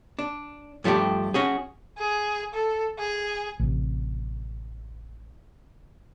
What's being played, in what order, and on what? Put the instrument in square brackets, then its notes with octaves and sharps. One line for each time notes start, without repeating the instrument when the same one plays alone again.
[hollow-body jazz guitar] D4
G2 F3 A3 D4 G4
C#4 F#4 G#4
[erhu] G#4
A4
G#4
[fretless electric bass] A1 C3